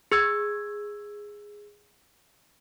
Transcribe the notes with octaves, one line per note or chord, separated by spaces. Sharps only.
G#4 E6 G#6